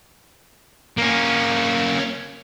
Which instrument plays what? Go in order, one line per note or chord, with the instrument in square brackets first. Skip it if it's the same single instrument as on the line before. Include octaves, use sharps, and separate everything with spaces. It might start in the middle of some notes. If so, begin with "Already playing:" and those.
[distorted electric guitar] A#3 C#4